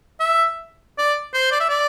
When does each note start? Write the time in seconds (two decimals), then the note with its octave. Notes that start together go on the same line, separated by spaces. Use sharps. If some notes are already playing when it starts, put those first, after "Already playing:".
0.20 E5
0.98 D5
1.33 C5
1.51 D5
1.60 E5
1.69 D5